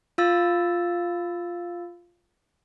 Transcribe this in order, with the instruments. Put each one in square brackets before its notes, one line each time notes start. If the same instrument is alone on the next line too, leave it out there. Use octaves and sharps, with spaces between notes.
[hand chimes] F4 F5 E6 A6